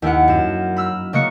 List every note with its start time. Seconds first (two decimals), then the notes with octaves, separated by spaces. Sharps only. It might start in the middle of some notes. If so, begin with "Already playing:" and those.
0.02 D#2 E4 A#4 F#5
0.28 F#2 E7
0.76 B5 E6 F6
1.13 C#3 A#3 D#5 C#6 F#6 C#7